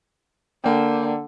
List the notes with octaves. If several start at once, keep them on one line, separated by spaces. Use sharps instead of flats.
D3 A#3 G5